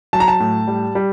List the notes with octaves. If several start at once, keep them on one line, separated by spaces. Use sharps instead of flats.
F#3 A5
A#5
A5
A2
G3
G3